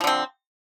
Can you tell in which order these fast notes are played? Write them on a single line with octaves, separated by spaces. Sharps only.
F3 D3 C4